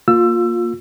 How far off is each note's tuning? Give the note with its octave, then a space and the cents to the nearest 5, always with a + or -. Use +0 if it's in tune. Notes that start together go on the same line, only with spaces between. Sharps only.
A#3 +0 F4 +20 E6 +20